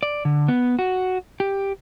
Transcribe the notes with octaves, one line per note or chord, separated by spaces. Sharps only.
D5
D3
B3
F#4
G4